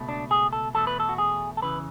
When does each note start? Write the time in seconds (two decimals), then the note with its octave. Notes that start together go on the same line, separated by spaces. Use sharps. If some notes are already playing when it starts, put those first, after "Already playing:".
Already playing: C#2 B2 A3
0.09 D4
0.31 G#4
0.53 A4
0.74 E2 B2 A3 A4
0.87 B4
1.00 A4
1.09 F#4
1.18 G#4
1.57 A4
1.62 E2 C#3 E3 B4